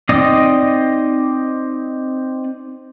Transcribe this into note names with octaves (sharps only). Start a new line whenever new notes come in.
C4 D#4 D5 D#5 D#6